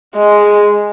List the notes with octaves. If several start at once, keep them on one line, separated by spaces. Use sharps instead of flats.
G#3